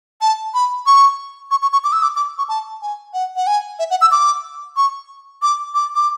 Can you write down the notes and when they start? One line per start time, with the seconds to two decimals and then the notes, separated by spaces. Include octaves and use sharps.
0.22 A5
0.54 B5
0.86 C#6
1.51 C#6
1.62 C#6
1.73 C#6
1.84 D6
1.92 E6
2.03 D6
2.16 D6
2.38 C#6
2.49 A5
2.82 G#5
3.14 F#5
3.36 F#5
3.47 G#5
3.79 E5
3.91 F#5
4.01 E6
4.11 D6
4.77 C#6
5.42 D6
5.75 D6
5.95 D6